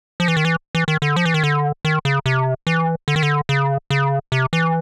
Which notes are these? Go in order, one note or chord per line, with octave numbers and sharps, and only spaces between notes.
F3
E3
D#3
E3
E3
D#3
D3
F3
E3
D#3
D3
D#3
C#3
C3
E3
D3
D#3
D3
C#3
C#3
C3
E3